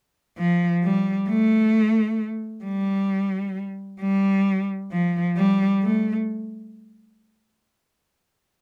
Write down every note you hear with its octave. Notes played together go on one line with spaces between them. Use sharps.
F3
G3
A3
G3
G3
F3
G3
A3